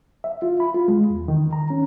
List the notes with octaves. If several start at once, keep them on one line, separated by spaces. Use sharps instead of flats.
E5
F4
B5
F4
G#3
E2
D#3
A#5
C#4